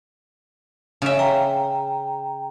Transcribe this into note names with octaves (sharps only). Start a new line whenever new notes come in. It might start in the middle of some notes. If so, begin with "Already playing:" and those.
C#3 E5
G5 A#5